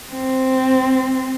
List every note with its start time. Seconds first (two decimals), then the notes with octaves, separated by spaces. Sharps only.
0.13 C4